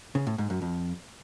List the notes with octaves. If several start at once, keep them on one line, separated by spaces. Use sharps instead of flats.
C#3
A2
G#2
F#2
F2